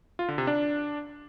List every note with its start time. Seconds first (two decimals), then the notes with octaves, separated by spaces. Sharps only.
0.19 F4
0.28 D3
0.38 C3
0.47 D4